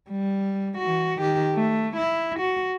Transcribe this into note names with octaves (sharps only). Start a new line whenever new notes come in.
G3
E3 F#4
D#3 G4
A3
E4
F#4